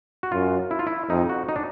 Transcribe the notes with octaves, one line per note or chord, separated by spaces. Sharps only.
F#4
F#2 F4
E4
F4
E4
F2 D#4
F#4
D#4
D4